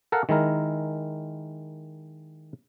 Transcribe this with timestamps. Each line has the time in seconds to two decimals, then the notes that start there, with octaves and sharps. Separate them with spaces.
0.12 A4 A#4 F5 F#5 A5
0.29 D#3 G#3 E4 A#4